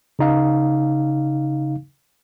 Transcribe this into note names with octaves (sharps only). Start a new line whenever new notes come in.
C#3 D#4 F5